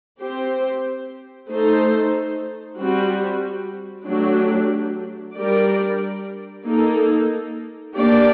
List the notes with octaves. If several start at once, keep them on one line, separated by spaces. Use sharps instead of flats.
C4 G4 C5
A3 D#4 A4 C5
G3 C4 F#4
F#3 A3 D4 G4
G3 D4 G4 A#4 D5
A#3 D#4 A4
A#3 D4 G4 D5